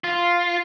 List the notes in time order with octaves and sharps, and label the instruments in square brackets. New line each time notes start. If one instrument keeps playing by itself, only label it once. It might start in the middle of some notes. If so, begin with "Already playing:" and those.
[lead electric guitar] F4